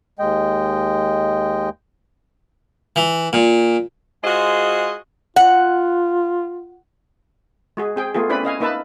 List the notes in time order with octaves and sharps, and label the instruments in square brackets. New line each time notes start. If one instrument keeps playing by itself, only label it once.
[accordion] D#2 G#3 D#5 G5
[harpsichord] E3
A#2
[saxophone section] G#3 F4 F#4 G#4 C5 D#5
[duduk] F4 [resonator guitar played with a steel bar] F#5
[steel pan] G#3 F#4 G#4
C4 G#4 G5
A3 B3 F4 G#4
C4 C#4 E4 B4 D5 B5
C#4 D#5 F5 G#5
A#3 D#4 B4 E5 A5 B5